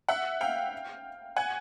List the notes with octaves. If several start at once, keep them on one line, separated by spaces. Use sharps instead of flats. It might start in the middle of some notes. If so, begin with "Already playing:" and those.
E5 F#5
F5 G5
F#5 G#5